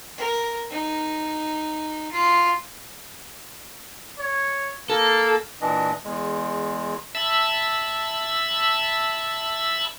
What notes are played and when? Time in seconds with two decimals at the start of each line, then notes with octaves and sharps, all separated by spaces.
0.18 A#4
0.71 D#4
2.12 F4
4.19 C#5
4.90 A#3 A4
5.61 A#2 E3 D4 D#5
6.04 E2 G#3
7.15 E5 A5 B5 E6